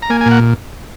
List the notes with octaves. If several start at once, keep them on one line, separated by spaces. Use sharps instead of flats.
A#5
A#3 G#5
G#5
A#2
F#5